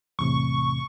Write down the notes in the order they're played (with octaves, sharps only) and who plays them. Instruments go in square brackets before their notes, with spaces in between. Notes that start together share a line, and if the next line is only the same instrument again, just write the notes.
[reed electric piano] E2 A2 C3 [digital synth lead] C#6